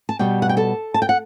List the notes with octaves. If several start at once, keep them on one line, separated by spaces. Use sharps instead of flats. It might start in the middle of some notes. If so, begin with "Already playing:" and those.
A5
B2 G3 B3 G4 G5
F#5
G5
A4 A5
A5
G5
F#5